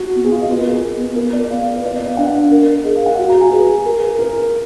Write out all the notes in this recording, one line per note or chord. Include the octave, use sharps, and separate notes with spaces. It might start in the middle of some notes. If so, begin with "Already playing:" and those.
Already playing: F#4
B3
G#4
F4
D#5
B3 B4
A#4
G#4
A#4
D5
B3 F5
B4
D5
D#5
F5
D4 F#5
A#4
G#4 D#5
F5
F#5
F#4 F5
A#5
G#5
G#4 B4
A#4
A#4